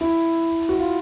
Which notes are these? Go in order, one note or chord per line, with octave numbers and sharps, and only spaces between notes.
E4
F#4
F4